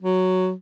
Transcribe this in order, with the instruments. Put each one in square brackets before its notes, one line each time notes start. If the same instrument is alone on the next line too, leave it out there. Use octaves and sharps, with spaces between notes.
[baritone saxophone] F#3